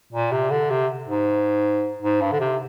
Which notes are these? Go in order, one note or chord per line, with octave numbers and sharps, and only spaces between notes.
A#2
C3
D3
C3
G#2
G#2
G2
D3
C3